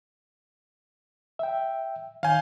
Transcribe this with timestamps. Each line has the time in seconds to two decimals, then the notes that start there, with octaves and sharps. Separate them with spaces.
1.39 E5 G5
2.23 D#3 C#5 F5 G#5 G6